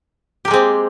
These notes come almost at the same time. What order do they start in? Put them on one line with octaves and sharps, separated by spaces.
G4 A#3 G#3 C4